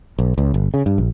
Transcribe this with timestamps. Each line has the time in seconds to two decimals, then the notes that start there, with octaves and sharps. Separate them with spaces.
0.19 B1
0.38 C#2
0.54 G1
0.74 C#3
0.86 G2
0.98 A#1